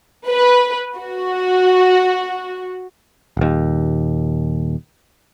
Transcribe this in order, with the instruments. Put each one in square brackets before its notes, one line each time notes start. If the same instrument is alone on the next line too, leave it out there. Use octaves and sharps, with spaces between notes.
[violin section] B4
F#4
[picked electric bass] D#1 D#2